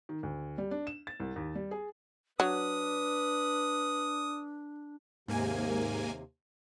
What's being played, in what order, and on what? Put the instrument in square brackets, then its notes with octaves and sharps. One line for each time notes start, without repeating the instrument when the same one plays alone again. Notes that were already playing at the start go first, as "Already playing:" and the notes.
[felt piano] D#3
D2
G3
D4
E7
A6
C2
D#2
G3
G#4
[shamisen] F#3 [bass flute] D4 [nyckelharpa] B4 [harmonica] D#6
[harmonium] D#2 C3 [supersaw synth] G#2 A#3 G#5